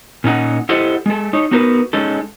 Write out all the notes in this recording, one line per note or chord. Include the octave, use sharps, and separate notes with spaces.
A#2 C#4 D#4 F#5
E4 G4 A4 C5 D#5 F#5
G#3 A4
D#4 C#5
B3 D#4 F#4 A#4 B4
G#3 C#4 D#4 A4